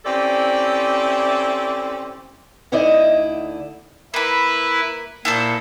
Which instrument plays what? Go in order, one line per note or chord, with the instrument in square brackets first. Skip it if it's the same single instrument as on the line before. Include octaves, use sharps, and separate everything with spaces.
[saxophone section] C4 C#4 E4 G4 A4 D5
[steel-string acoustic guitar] D2 D3 D#4 E4 D5 D#5
[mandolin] A#3 B5 [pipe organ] E4 B4
[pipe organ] A#2 [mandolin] E4 A4 C5